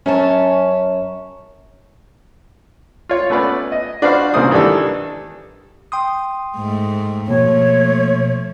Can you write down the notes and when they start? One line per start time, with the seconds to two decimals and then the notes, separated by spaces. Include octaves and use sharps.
0.06 F#2 C#4 C#5 A5
3.09 F4 C#5
3.30 A3 B3 C#4 B4 D5
3.72 D#5
4.02 D4 F#4 B4 C5 F5 C#6
4.34 C2 C#3 A#3 C5 D5 D#6
4.51 D#3 E3 G3 D4 A4
5.92 G5 C6 D#6
6.57 G#2 A3
7.28 B2 F3 A3 A#3 C#5